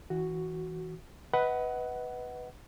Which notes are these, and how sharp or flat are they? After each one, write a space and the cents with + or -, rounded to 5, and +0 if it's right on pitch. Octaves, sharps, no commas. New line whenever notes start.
E3 -30 F#4 +0
B4 +0 D#5 +35 F#5 +10